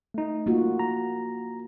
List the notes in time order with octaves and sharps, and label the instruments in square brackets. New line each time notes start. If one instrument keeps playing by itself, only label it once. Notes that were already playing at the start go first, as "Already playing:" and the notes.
[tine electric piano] A3 D#4
[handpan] A#3 F4 F#4
[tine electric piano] A#5